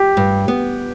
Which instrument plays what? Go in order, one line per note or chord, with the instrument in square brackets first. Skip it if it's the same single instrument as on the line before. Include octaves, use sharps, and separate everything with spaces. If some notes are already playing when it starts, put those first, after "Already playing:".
Already playing: [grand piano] G4
[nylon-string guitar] G2
B3